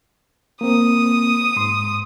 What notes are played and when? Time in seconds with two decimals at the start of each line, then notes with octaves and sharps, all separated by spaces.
0.61 A#3 C4 D#6
1.56 G#2 C6